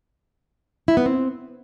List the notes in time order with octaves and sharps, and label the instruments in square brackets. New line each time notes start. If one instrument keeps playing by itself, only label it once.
[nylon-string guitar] E4
B3
C4